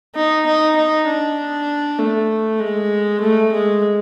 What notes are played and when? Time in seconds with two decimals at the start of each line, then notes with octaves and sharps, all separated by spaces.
0.15 D#4
0.46 D#4
0.76 D#4
1.07 D4
1.99 A3
2.60 G#3
3.21 A3
3.52 G#3